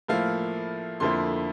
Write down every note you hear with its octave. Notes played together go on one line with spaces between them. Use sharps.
A2 F3 A#3 E4 F5
F2 D3 F3 A#3 E4 C6